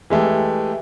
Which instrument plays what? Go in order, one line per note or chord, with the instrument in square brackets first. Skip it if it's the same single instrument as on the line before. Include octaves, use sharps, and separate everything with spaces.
[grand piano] E3 G#3 A3 G4